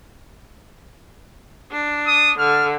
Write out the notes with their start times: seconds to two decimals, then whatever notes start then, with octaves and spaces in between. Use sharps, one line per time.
1.71 D4
2.07 D#6
2.38 D3 F6